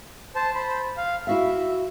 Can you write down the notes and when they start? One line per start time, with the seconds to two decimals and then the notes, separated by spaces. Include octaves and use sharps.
0.35 C5 A5
0.55 C5 B5
0.97 F5
1.27 E4 F#4 E5 F5